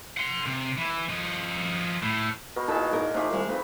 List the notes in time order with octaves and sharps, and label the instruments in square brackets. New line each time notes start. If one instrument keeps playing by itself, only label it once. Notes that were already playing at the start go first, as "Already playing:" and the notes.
[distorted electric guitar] F#5 C6
C3
E3
F3 D#5
A2
[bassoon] B2 [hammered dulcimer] A#4
[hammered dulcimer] A#2 G#3 [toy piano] D#4 E4 A#4 [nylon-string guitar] A4
[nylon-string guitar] G#2 D#4 A#4 [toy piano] G#4
[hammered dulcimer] F3 A3 [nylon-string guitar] D#4 G4 G#4 [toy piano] C5 F5 D6
[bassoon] C2 [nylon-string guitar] D#3 G3 G#3
[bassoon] F2 [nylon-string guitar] D#4 [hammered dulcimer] B4